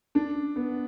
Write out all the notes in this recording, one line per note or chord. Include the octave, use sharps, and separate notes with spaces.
D4
B3